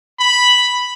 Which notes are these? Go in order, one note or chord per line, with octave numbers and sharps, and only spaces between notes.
B5